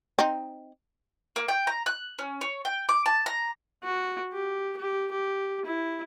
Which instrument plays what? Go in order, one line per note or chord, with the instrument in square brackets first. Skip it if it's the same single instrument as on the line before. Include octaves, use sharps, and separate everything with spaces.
[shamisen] C4 D#4
[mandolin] A#3
G5
A#5
F#6
C#4
C#5
G5
D6
A5
A#5
[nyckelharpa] F#4
G4
G4
G4
E4